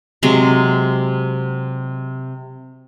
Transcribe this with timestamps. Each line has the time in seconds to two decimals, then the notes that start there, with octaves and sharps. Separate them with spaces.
0.23 C3 F#3 G#3